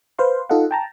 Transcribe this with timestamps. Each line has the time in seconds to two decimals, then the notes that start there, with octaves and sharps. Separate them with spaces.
0.19 B4 C5 F5 C6
0.49 D#4 F4 A4 D#5 F5 F#5
0.71 G5 A5 A#5